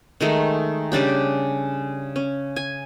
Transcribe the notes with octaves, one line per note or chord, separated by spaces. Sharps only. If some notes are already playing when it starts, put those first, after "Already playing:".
D#3 G#3 A3
C#3 G3 D4 G4
C#4
G#5